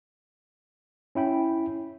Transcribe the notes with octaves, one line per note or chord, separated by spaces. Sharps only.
C#4 E4 G5 B5